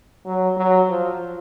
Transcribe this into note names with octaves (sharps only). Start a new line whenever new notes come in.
F#3
F#3
F3